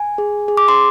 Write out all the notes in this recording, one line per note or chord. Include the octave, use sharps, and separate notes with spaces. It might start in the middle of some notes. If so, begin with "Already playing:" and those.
Already playing: G#5
G#4
G#4
D6
C6